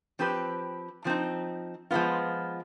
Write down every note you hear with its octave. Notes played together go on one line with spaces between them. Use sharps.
F3 C4 G4 B4
F3 C4 D#4
F3 G#3 B3 F4